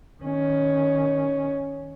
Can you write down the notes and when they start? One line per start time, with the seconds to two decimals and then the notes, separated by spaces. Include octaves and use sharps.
0.23 D#3 C#4